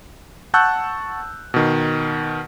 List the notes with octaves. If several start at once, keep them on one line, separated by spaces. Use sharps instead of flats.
F#5 A5 C#6 E6 F#6 G6
B2 D#3